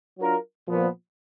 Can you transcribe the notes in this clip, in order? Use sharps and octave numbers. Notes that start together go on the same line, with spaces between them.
F#3 D4 F4 A#4
A#2 F3 B3